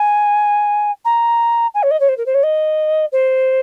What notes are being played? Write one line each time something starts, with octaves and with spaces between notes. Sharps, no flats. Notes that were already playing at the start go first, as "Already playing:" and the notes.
Already playing: G#5
A#5
G#5
C#5
D#5
C#5
C5
A#4
C5
C#5
D#5
C5